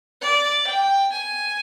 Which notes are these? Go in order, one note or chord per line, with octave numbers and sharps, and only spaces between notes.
D5
G5
G#5